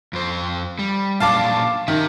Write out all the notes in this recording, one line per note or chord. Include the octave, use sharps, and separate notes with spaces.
F2 C5
G3
A#2 F#3 D4 F5 A5 D6
D#3 G4 E5